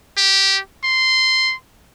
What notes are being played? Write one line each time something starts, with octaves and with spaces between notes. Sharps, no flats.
G4
C6